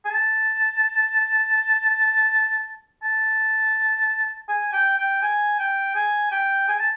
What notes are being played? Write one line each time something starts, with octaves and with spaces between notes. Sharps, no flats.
G#5
A5
A5
G#5
G5
G5
G#5
G5
G#5
G5
G#5
A5